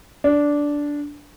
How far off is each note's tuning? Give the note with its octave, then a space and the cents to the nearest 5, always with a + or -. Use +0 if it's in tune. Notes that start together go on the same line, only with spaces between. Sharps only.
D4 -10